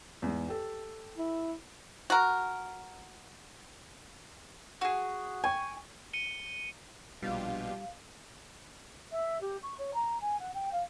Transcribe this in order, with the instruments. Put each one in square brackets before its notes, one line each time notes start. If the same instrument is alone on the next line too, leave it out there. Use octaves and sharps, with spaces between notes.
[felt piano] E2 G#2
G4 A4
[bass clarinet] E4
[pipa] F#4 A#4
[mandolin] F#4 G#4
[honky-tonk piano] G5 C#6 [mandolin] G#5
[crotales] C#7 D#7 G7
[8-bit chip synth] A#1 B2 [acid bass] G3 [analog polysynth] D4 F4 G4 [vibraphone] F5
[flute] E5
G4
C#6
C#5
A#5
G#5
F#5
G5
F5